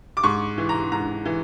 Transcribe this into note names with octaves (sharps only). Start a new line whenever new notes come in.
D6
G#2 C#6
E3
A#5
G#2 A#5
E3